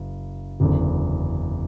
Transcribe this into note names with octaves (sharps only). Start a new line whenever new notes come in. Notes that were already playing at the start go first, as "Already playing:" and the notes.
Already playing: F#1
F#1 E2 D3